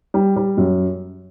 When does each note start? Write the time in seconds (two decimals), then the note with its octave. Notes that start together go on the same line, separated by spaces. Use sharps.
0.14 G3
0.36 G3
0.57 F#2